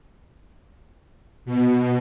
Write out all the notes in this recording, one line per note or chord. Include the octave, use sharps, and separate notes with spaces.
B2